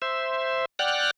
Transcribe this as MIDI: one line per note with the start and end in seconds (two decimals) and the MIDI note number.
0.02 0.65 72
0.02 0.65 76
0.79 1.11 74
0.79 1.11 78
0.79 1.11 79
0.79 1.11 89
0.79 1.11 90